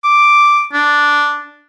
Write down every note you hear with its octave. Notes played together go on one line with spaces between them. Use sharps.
D6
D4